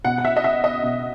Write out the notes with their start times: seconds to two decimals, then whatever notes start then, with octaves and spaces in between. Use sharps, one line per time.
0.05 B2 F#5
0.18 F#5
0.25 E5
0.37 D#5
0.44 E5
0.64 D#5
0.83 B2